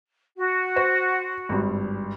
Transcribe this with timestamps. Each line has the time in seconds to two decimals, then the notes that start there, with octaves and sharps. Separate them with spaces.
0.37 F#4
0.76 C5
1.49 G#1 G2